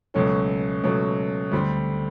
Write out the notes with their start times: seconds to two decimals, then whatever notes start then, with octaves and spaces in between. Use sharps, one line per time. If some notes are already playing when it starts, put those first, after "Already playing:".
0.14 C#2 B2 F#3 A3 C#4
0.83 C#2 B2 F#3 A3 C#4
1.52 D2 D3 G3 C4